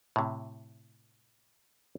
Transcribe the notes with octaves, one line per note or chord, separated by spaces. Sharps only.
A2 C3